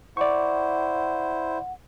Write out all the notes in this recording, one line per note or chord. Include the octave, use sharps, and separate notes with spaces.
E4 C5 D5 F#5 C#6